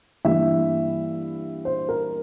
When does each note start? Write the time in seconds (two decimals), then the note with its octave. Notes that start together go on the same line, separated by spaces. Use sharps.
0.25 G2 E3 A#3 E5
1.65 C5
1.89 A#4